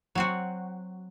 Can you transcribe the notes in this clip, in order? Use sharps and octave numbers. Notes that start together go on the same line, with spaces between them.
F#3 C4 F#4